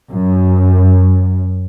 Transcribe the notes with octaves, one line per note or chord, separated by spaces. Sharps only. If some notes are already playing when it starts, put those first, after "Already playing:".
F#2